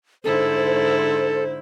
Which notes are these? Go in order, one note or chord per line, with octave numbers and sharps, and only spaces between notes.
G#2 D3 E4 A4 C5